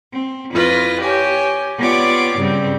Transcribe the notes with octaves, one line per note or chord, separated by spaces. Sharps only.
C4
F2 E4 F4 B4 A#6
G4 C#5 G#5
B3 F4 G4 C#5 D5 D6
G2 C#3 G3 C4